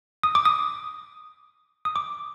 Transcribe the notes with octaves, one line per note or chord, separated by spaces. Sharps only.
D#6
D6
D#6
D#6
D6